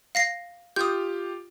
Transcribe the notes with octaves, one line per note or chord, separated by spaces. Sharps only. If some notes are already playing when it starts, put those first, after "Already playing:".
F5 A#6 C7
F4 G4 D#6 G6